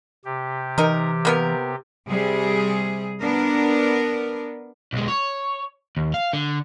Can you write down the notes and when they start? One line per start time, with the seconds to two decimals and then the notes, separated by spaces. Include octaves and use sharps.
0.25 C3 G4
0.78 E3 D#4 A#4
1.25 A#3 B3 A#4
2.09 C3 G3 G#4
3.22 B3 D4 A#4
4.93 B1 G#3
5.08 C#5
5.97 D#2
6.14 F5
6.34 D3